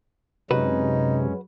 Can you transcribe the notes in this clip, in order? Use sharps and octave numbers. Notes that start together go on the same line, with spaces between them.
F#2 C3 G#3 C#4 D#4 F#4 B4